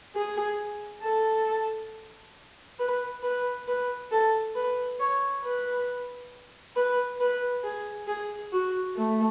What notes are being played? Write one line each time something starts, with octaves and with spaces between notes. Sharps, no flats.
G#4
A4
B4
B4
B4
A4
B4
C#5
B4
B4
B4
G#4
G#4
F#4
A3